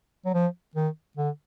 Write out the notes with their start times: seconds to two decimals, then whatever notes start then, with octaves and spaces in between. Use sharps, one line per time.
0.25 F#3
0.34 F3
0.75 D#3
1.17 D3